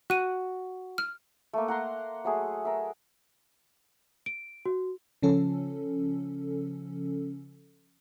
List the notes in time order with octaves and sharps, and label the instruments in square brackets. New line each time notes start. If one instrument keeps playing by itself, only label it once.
[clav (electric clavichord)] F#4 [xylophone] F#6 D#7
[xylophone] F6
[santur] A3 A#3
F#5 A#5 C6
F#3 A3 G#4
A#4 E5
[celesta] D7
F#4
[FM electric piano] C#3 F3 C#4 A4